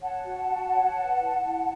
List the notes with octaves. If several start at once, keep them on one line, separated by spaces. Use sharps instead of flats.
C#5 F#5 A5
F#4
F#4
C#5
B4
E4
E4